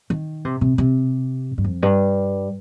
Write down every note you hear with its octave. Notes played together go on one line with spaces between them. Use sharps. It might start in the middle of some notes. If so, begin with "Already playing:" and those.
D#3
C3
C3
C3
G2
F2
G2